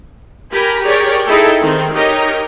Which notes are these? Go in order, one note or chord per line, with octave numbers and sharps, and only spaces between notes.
G4 A#4 G#5 B5
G4 G#4 A#4 C#5 D5
D#4 E4 G#4 A4 G5
D#3 C4
D#4 G4 A#4 C#5 D#5